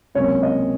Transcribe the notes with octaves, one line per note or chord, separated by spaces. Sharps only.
C#2 C3 F#3 A#3 C#4 C#5
D#5